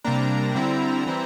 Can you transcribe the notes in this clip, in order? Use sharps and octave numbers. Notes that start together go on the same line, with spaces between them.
C3 G3 A#3 D4 A#5
D3 G3 C4 E4
E3 G3 C4 E4